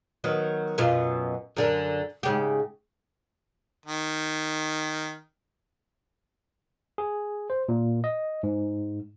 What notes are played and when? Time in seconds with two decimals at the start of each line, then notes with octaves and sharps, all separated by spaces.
0.24 D#3 F#3 B3
0.78 F#2 B2 F4
1.57 F#2 D3 A#4
2.23 G#2 C#3 G4
3.86 D#3
6.98 G#4
7.50 C5
7.69 A#2
8.04 D#5
8.43 G#2